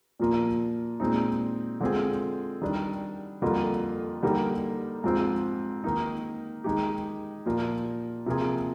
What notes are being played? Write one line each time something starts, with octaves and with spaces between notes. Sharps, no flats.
A#2 F3 A#3 F4
A#2 G#3 C4 D#4
D3 G#3 C4 F4 G#4
D#3 G3 D4
F2 D3 G3 A#3 F4
D3 G3 A#3 D#4 G4
G#2 F3 C4 F4
D#3 A#3 D#4
D#3 G#3 D#4 G4
A#2 F3 A#3 F4
C3 F3 A#3 F4 G#4